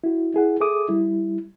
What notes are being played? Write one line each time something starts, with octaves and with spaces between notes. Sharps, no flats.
E4 F#4
E4 G#4 F#5
G#4 A4 E5 D6 D#6
G3 E4